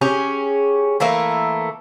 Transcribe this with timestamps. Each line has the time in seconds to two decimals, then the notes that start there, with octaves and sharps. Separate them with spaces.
0.01 C#4 G4 G#4
1.00 E3 A3 A#3 E5